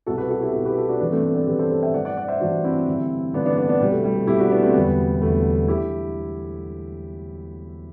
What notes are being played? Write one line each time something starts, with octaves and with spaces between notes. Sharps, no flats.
C2 B2 F#4 A4
G4 B4
F#4 A4
E4 G4
B2 F#4 A4
C2
G4 B4
F#4 A4
D4 F#4
A1 G2 E3 B3 D4
A3 C4
A3 C4
B3 D4
A1 G2 E3 G4 B4
A4 C5
A4 C5
E5 G5
A1 G2 E3 D5 F#5
D5 F#5
D5 F#5
C5 E5
A1 G2 E3 D4 F#4
C4 E4
A1 G2 D3
A1 G2 D3 B3 D4
B3 D4
B3 D4
B3 D4
C2 B2 G3
A3
G3
A3
C2 B2 E4 G4
D4 F#4
B3 D4
A3 C4
E1 D2 D3 G3 B3
B3
E1 D2 D3 A3
D3 E4 G4